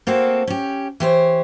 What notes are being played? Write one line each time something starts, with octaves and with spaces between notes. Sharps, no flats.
A#3 C4 F#4 A4
C#4 G4
E3 G4 C5 C#5